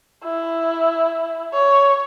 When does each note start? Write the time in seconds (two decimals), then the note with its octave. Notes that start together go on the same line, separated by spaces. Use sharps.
0.25 E4
1.54 C#5